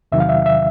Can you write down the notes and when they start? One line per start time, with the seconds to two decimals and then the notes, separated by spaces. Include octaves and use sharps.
0.12 E2 C3 D#3 F#3 E5
0.20 F5
0.29 E5
0.46 E5